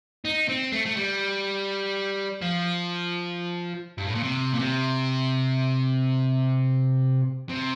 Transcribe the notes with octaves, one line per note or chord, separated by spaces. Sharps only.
D#4
C4
A3
A3
G3
F3
G2
A2
A#2
C3
A#2
C3
C3